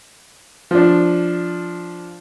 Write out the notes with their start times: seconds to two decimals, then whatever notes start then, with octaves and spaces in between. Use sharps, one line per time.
0.71 F3 D4